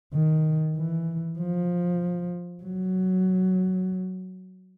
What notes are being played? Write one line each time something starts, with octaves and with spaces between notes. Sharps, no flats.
D#3
E3
F3
F#3